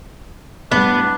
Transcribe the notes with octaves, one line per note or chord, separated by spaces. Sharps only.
A2 G3 B3 D4